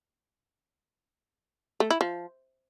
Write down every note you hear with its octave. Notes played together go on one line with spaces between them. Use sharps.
A3
E4
F3